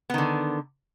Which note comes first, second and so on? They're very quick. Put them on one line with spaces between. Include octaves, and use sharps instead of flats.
B3 D#3 D3